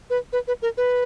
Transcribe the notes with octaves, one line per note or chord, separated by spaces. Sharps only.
B4
B4
B4
A#4
B4